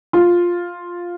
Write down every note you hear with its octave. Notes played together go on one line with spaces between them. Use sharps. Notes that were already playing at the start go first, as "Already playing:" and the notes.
F4